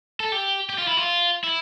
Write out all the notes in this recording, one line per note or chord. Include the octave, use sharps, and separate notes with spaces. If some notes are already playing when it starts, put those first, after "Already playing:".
A4
G4
G4
F4
E4
F4
E4